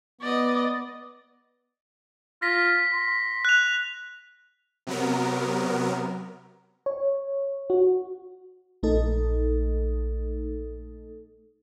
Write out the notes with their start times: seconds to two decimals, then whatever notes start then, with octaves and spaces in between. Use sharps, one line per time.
0.21 B3 D5 D#5
2.42 F4 A#6 B6
2.93 C6
3.45 F#6 F7
4.87 C3 F#3 B3 A#4
6.86 C#5
7.70 F#4
8.83 A#1 A3 D#4 A4